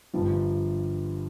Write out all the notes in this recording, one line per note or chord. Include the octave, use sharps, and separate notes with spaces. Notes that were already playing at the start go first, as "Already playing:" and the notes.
G1 G2 F3